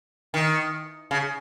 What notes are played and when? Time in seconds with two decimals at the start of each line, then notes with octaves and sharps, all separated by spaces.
0.34 D#3
1.11 C#3